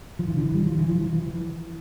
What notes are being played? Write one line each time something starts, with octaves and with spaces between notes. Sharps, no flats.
F3
E3
D3
E3
G3
F3
E3
F3
F3
E3